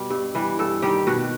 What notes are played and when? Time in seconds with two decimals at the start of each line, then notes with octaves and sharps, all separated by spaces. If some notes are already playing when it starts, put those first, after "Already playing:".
Already playing: B2 G3
0.10 G2
0.35 E3 G3
0.59 G2 A4
0.82 D#3 G3 G4
1.07 B2 F#4